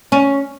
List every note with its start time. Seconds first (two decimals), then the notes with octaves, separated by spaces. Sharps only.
0.12 C#4